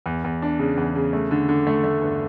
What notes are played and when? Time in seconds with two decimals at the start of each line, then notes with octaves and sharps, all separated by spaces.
0.06 E2
0.24 E2
0.42 D4
0.59 C#3
0.77 E2
0.95 C#3
1.13 A3
1.31 D3
1.49 D3
1.67 A3
1.84 A3
2.02 G2